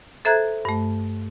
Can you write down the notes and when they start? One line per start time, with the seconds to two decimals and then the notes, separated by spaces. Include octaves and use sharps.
0.25 A4 C5 E5 A#5 F#6 G#6
0.65 G2 A3